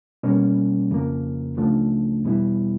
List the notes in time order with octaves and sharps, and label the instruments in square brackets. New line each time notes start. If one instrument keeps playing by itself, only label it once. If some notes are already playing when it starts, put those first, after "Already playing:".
[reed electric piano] B2 G3 A#3 C#4
F2 C#3 F3 A#3
C#2 C#3 F3 A3 D4
E2 B2 G3 B3 E4